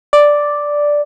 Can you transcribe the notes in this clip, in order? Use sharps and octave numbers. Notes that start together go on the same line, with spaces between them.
D5